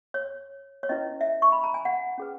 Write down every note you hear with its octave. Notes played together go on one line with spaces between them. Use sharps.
C#5
C#5
C#4 E4 B4 D#5
E5
C#6
B5
A#5
G#5
F#5
C#4 G#4 B4